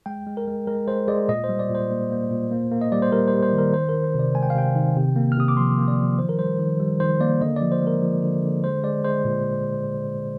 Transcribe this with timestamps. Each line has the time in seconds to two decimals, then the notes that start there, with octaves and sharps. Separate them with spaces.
0.06 G#3 G5
0.27 G#3
0.37 A#4
0.47 G#3
0.67 G#3 A#4
0.88 G#3 C5
1.08 G#3 D5
1.29 A#2 D#5
1.44 C5
1.49 G3
1.59 D5
1.69 A#2
1.75 C5
1.90 A#3
2.11 A#3
2.30 A#2
2.51 A#3
2.71 A#3
2.81 D#5
2.92 G3 D5
3.02 C5
3.12 G3 A#4
3.28 C5
3.33 G3
3.43 C5
3.53 D#3
3.58 A#4
3.74 D#3 C5
3.89 A#4
3.94 D#3
4.04 C5
4.15 C3 D5
4.35 G#3 G#5
4.43 G5
4.50 F5
4.55 C3 G5
4.76 D#3
4.96 C3
5.16 A#3
5.32 F6
5.37 C3 D#6
5.48 D6
5.57 F3 C6
5.78 A#3
5.88 D5
5.98 F3
6.19 D#3 C5
6.29 A#4
6.39 G3 C5
6.59 D#3
6.80 G3
7.00 D#3 C5
7.20 A#3 D5
7.41 D3 D#5
7.56 F3 D5
7.72 C5
7.82 G#3
7.87 A#4
8.02 F3
8.23 D3
8.43 D3
8.64 G#3 C5
8.83 G#3 D5
9.04 G#3 C5
9.25 A#2